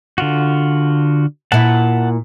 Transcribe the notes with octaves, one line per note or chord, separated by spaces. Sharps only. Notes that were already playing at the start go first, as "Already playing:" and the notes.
D3 F4 F#4
A#2 E4 F#5 A5